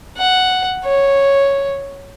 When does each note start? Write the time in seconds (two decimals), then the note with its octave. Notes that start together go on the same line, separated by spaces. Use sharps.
0.18 F#5
0.85 C#5